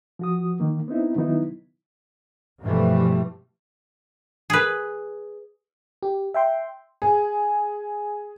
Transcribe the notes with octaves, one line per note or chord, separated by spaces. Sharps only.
F3 F#4 D#6
D#3 A#3
B3 C4 D#4 E4
D#3 F#3 B3 D#4 E4
G2 B2 E3 F3 G3 A3
G#4 B4
G4
E5 G5 C6
G#4